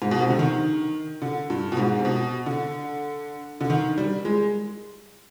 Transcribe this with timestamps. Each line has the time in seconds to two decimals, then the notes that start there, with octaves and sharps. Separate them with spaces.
0.02 G#2
0.11 B2
0.20 C3
0.30 D3
0.39 D#3
1.22 D3
1.50 G2
1.72 B2
1.77 G#2
1.99 C3
2.05 B2
2.46 D3
3.61 D3
3.70 D#3
3.98 G3
4.25 G#3